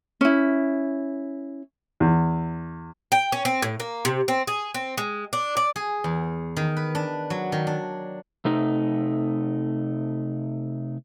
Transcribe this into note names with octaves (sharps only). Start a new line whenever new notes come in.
C#4 E4
E2
G5
C#4
C4
A2
A#3
C3
C4
G#4
C4
G#3
D4
D5
G#4
E2
D#3
B4
D4
F#3
D#3
D4
C3 A3 D#4